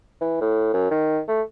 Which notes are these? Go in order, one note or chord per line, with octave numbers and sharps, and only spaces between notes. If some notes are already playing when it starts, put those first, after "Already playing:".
E3
A2
F#2
D#3
A3